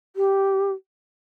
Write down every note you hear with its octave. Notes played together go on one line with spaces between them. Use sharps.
G4